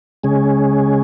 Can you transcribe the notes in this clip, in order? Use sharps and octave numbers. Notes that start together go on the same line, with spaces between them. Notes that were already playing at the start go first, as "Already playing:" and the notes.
C#3 G#3 C#4 G#4